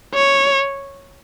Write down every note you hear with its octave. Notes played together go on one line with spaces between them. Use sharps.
C#5